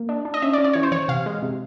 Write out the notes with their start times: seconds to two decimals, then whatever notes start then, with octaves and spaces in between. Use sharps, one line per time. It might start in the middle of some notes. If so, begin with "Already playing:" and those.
Already playing: A#3
0.09 D4
0.25 D4
0.34 D#5
0.42 C#4 E5
0.53 D5
0.58 C#4
0.64 D5
0.73 E3 C#5
0.83 C5
0.92 E3 C#5
1.08 C3 F5
1.26 G#3
1.42 C3